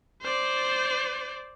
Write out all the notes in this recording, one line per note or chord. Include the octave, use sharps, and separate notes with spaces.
C5 D5